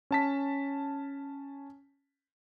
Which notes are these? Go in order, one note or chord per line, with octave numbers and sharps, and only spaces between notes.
C#4 A5 B6